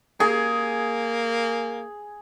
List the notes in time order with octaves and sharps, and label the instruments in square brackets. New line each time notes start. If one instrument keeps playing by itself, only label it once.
[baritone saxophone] A#3 [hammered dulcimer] G#4